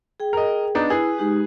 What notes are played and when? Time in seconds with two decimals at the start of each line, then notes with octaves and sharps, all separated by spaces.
0.20 G#4 G5
0.33 A#4 D#5
0.75 B3 D4 D#4
0.90 E4 G#4 B4
1.18 G#3 D#4 G4